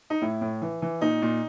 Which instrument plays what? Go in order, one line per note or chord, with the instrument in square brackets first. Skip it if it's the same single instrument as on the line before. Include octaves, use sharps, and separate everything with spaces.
[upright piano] D#4
A2 E4
A2
E3
E3
A#2 D#4
A#2